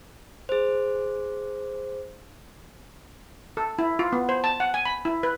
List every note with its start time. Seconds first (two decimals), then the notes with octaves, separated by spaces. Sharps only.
0.49 G#4 C5
3.57 A4
3.79 E4
3.99 F4
4.13 B3
4.29 C5
4.44 A5
4.60 F#5
4.74 G#5
4.85 B5
5.05 E4
5.23 B4